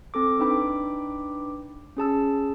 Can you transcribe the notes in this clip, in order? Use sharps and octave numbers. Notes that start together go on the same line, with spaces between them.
C4 A4 D6
D4 D#4 B4 G5 B5 D6
C#4 G#4 A5 E6